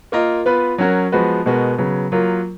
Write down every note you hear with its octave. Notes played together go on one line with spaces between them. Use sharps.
A#3 F4 A#4 D#5
B3 F4 B4
F#3 C#4 F#4 A#4
F3 G#3 B3 F#4 B4
B2 G#3 B3 F#4 A#4
C#3 F#3 B3
F#3 A#3 F4 A#4